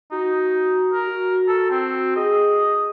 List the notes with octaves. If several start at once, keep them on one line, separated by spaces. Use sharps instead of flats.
D#4 F#4
A#4
F#4
A4
C4
G#4 D#5